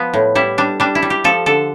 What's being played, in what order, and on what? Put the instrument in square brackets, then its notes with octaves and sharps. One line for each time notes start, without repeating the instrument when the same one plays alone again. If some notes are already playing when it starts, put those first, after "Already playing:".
Already playing: [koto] F3 B3
A2
G3 E4
G3 D4
G3 D4
E4
G3
G4
F3 A4
D3 A4